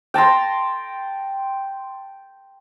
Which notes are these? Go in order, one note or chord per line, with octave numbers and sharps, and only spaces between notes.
G5 A5 A#5 C6